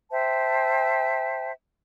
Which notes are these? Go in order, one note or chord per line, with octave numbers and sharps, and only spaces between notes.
C5 E5 G5 A5